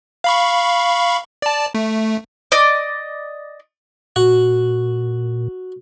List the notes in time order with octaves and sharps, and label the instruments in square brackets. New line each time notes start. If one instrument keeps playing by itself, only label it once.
[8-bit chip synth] F5 B5 C#6
D5 A5
A3
[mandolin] D5 D#5
[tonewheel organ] A#2 [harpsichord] F#4